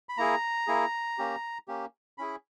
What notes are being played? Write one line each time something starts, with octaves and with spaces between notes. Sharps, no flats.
B5
A#3 E4 G#4 A#5
A#3 E4 G#4
A#3 C#4 G4
A#3 C#4 G4
C#4 E4 G#4 B5